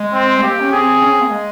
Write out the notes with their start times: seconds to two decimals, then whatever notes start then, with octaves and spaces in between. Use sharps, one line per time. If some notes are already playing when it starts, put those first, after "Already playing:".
Already playing: G#3
0.13 C4
0.38 G#3
0.43 A#3 G4
0.60 C#4
0.72 C4 G#4
1.01 C#4
1.11 C4
1.21 A#3
1.31 G#3